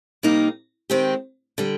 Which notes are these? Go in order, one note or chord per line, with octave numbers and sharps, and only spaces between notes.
C3 G3 A#3 D#4 A#4
D#3 G#3 C4 G4
D3 G3